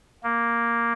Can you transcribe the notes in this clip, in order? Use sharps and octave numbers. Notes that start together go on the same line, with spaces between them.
A#3